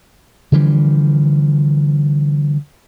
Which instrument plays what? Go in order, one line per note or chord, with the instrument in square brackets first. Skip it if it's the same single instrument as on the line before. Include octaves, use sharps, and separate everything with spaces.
[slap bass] D3 E3 F3 G3